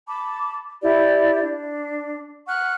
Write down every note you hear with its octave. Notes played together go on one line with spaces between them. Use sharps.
A5 B5 D6
E4 G4 D5
D4
F#5 C#6 F6 F#6